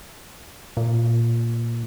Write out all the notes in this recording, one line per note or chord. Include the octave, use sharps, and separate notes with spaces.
A#2